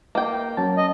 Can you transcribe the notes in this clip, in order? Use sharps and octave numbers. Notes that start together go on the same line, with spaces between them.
A#3 G5
F#3 C#4 A5
D#5